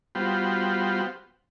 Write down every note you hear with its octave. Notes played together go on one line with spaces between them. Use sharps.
G3 B3 F4 F#4 C5 G5